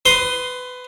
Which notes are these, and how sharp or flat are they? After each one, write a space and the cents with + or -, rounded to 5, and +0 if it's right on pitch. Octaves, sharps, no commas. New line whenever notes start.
B4 +20 C6 +0 D#6 +0